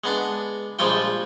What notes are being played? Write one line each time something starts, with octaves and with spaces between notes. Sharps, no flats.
G#3 B3 D4
A#1 F3 G3 G#3 F4 G5